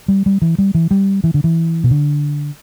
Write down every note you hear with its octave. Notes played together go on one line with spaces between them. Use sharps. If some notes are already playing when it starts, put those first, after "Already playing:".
G3
G3
E3
G3
E3
G3
E3
D3
E3
B2
D3